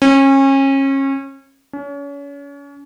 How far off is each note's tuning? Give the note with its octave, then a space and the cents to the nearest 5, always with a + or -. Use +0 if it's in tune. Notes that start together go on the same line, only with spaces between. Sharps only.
C#4 -30
C#4 +35